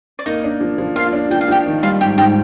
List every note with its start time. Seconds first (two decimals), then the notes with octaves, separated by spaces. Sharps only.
0.19 D5
0.26 A#3 D#4 D#5
0.44 D4
0.61 F3
0.78 F3
0.95 A#3 F4 F5
1.13 D4
1.30 F3 G5
1.41 F5
1.48 F3 G4 G5
1.66 D#3
1.83 G3 F4 F5
2.01 G#2 G4 G5
2.18 G#2 G4 G5